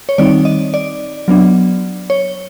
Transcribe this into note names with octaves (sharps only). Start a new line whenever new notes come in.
C#5
D#3 G3 C4 D#4 D5
D#5
D5
F#3 B3 D4
C#5